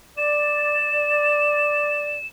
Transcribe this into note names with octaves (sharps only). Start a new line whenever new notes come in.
D5 E7